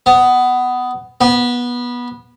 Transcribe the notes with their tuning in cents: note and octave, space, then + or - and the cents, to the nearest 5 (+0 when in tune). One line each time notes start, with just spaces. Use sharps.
B3 +15
B3 -20